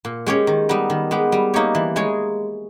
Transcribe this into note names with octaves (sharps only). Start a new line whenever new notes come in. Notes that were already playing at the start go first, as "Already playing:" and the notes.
A#2
G#3 C#4 G4 C#5
D#3
G3 B3 D#4
D#3
G#3 B3 G4
G3
A#3 D#4 G4 C#5
E3
G#3 D#4 G#4 C#5